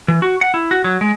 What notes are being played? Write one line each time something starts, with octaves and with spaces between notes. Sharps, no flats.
E3
F#4
F#5
E4
F#4
F#3
G#3